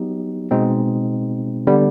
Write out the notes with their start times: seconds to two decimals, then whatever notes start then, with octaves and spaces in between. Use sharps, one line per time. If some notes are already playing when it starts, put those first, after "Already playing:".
Already playing: F#3 B3 D#4 G4
0.51 B2 G#3 C4 D#4
1.67 D3 G3 B3